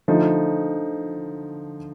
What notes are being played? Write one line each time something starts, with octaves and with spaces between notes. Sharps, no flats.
D3 F3 A3 D#4